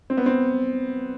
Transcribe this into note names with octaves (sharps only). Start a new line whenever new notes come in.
C4
B3
C4